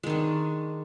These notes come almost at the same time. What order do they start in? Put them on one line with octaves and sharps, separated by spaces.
G#3 D#3 D4